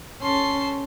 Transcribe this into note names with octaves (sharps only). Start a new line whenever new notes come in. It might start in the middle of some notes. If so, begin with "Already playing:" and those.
C#4 A4 C6